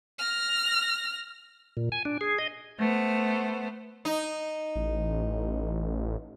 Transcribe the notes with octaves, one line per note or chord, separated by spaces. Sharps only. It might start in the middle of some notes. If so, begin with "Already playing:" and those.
F6 A#6
A#2
G#5
D4
G#4
D#5
A3 B3 C5
D#4
A1